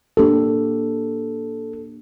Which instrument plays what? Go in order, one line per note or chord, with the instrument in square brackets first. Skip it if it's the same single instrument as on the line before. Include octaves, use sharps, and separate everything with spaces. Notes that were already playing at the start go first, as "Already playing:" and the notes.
[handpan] A#3 D4 G4 [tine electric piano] A4